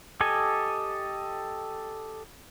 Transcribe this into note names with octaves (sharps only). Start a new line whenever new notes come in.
G4 A4 D#5 G#5